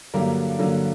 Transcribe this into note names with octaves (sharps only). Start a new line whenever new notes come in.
G2 D3 F#3 A#3 G4 A#4
G2 D3 F#3 A#3